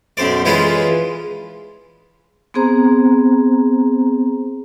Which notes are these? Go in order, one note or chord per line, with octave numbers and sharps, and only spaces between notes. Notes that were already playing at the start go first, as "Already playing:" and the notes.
B1 F#2 C5 D5
E3 G#3 C#4 F4 B4
B3 C4 G#4 C5 A#5